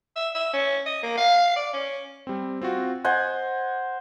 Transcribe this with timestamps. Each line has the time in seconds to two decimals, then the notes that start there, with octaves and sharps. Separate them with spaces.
0.16 E5
0.35 E5
0.53 C#4
0.86 D#5
1.03 A#3
1.17 F5
1.56 D5
1.73 C#4
2.27 G3 C4
2.62 C4 F4 F#4
3.04 C5 D#5 F#5 G#5